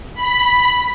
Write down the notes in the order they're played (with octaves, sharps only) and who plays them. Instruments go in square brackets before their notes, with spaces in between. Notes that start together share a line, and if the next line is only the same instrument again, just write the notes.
[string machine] B5